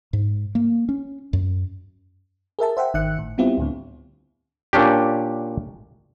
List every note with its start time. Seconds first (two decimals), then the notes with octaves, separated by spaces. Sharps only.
0.13 G#2
0.55 A#3
0.89 C#4
1.33 F#2
2.59 G#4 A#4 E5 A5
2.77 C5 E5 F#5 G5
2.94 G#1 D#3 E5 F#6 C#7
3.18 A2
3.38 G3 B3 C4 E4 F4 G4
3.58 D2 A2 D3
4.73 A#2 C#4 D4 G4